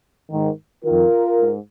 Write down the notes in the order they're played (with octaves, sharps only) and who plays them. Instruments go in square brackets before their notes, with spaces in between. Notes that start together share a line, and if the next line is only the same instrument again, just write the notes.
[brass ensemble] G#2 D#3
F2 D#3 F4 A#4
G#2